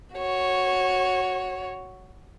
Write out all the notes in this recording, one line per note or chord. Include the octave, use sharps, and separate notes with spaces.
F#4 C#5